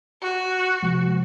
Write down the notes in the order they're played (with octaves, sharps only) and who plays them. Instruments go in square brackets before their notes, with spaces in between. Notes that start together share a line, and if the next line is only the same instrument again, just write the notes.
[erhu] F#4
[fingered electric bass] C3 F3 G#3